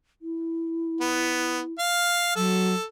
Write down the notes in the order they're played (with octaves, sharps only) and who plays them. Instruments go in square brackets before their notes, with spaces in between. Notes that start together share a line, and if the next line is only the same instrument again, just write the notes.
[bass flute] E4
[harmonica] B3
F5
[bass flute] F#3 [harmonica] A4